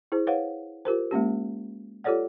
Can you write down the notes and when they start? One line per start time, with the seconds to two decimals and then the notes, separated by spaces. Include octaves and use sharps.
0.12 E4 G#4 C5
0.27 B4 C#5 F5 F#5
0.85 F4 G4 A#4 C5
1.11 G#3 A#3 C#4 G4
2.04 F4 G4 A4 C#5 D5 F#5